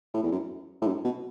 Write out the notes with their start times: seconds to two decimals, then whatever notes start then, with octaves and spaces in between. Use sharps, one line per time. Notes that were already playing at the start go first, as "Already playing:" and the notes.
0.14 A2
0.23 E2
0.32 F#2
0.82 A2
0.87 F#2
1.04 B2